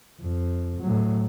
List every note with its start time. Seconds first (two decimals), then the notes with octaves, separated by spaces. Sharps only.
0.21 F2
0.81 A2 F#3